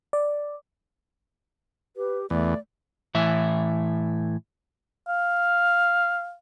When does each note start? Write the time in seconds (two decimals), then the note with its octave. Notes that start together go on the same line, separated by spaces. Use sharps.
0.13 D5
1.97 G4 B4
2.30 E2 A3 D5
3.15 A2 E3 E5
5.08 F5